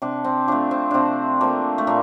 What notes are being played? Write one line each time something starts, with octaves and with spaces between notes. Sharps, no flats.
C3 D4
C4
F3 A3 D4
C4
C3 C4 D4
F3 A3 A#3
A3
A#2 A#3